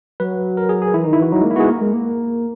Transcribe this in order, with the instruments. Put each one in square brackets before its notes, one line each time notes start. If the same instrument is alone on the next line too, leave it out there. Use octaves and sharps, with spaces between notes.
[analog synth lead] F#3 [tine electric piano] B4
[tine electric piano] A#4
G#4
G#4
[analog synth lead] E3 [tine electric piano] E4
[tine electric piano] D#4
[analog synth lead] D#3
[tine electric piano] E4
[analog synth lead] E3 [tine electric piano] F#4
[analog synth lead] F#3 [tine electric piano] D#4
[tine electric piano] G#3
[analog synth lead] A#3
[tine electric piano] E4
[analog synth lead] B3 [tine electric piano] F#4 G#4
[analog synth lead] A#3 [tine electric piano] A#4
[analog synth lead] G#3
A#3